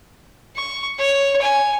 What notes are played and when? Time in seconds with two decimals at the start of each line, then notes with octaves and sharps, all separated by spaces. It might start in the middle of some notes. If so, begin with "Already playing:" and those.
0.55 C#6
0.98 C#5
1.41 G#5